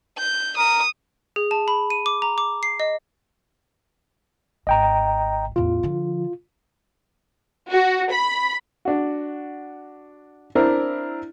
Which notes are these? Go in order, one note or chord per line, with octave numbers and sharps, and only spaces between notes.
G6
A#4 D#6
G#4
A5
B5
D#7
D6
A#5
D6
C7
D#5
G#1 D#5 G5 A#5
A1 E2 F4
D3 F3
F#4
B5
D4 F#4
C4 D4 E4 A#4